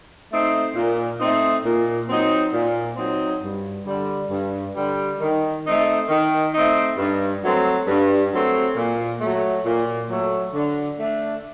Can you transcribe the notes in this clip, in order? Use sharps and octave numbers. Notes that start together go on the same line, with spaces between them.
A3 C4 D#4
A#2
A3 C4 D#4
A#2
F#3 C4 D#4
A#2
F#3 C4 D#4
G2
D3 G3
G2
D3 G3
D#3
A3 C4 D#4
D#3
A3 C4 D#4
G2
F#3 A3 C4
G2
F#3 A3 C4
A#2
F#3 A3
A#2
F#3 A3
D3
A3 D4